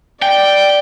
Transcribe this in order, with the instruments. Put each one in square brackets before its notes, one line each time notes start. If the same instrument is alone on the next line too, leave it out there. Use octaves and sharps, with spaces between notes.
[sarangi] D5 [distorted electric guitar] G5